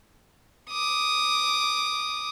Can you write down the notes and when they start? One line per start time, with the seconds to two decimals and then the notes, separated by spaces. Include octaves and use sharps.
0.71 D6 D#6